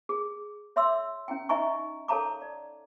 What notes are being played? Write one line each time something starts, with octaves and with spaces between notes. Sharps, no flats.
G#4
C#5 E5 C6 D6 E6
C#4 E4 G5
D#4 D#5 E5 G#5 A#5 C#6
A4 C#5 F5 A5 A#5 D6
D5